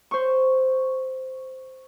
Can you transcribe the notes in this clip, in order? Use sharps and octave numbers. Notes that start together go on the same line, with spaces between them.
C5 C#6